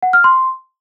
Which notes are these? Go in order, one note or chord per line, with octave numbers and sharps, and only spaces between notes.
F#5
F6
C6